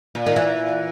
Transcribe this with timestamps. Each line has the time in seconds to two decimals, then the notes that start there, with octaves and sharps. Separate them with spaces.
0.15 A#2
0.26 D#3
0.36 E3